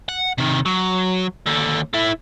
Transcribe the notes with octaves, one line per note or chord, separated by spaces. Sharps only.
F#5
C3 D#3
F#3
D#2 D3
A3 E4